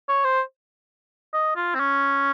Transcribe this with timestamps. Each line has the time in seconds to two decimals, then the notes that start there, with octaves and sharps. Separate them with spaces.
0.09 C#5
0.25 C5
1.34 D#5
1.56 F4
1.75 C4
1.80 C#4